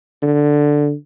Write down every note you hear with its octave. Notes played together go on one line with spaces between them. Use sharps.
D3